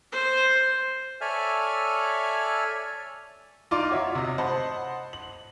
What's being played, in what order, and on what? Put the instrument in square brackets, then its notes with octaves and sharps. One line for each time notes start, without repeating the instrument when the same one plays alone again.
[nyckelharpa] C5
[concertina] A4 C#5 D5 E5 G#5 F6
[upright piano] D#4 F4 D5 C6 D6
F#4 C#5 E5
C3 D#5
C5 D#5 F#5 A5 B5
F#7